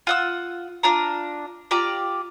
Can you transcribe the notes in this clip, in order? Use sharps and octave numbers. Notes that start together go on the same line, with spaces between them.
F4 F#5 E6
D4 F4 A#5
F4 G4 D5 A#5